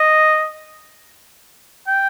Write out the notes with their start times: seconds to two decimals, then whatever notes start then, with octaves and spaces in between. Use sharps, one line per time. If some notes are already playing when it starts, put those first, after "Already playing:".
Already playing: D#5
1.87 G5